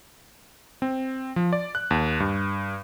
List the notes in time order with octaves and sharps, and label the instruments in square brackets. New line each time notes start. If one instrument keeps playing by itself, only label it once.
[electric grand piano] C4
F3
D5
F#6
D#2
G2